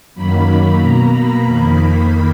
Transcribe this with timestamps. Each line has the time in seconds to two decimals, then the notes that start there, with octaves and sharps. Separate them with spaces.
0.15 F#2 D#3 F#3 A#3 B5
0.80 B2 A#3 A#5
1.12 B5
1.45 F2 D#3 A#3